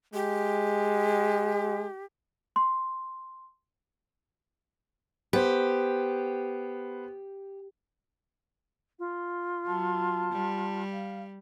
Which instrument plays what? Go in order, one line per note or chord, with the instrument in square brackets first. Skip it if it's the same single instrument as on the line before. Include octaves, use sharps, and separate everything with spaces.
[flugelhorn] G#3 [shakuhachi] G4
[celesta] C6
[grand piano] B3 C5 [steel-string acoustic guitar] G4
[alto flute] F4
[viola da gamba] F#3 [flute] A5
[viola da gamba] G3
[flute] F5